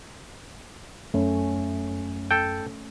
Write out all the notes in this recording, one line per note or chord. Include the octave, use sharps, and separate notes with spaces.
F#2 A3 C#4
A4 G5